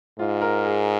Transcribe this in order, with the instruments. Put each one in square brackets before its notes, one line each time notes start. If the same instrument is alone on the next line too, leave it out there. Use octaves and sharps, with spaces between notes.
[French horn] G#2 [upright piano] F4
[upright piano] A#4
G#4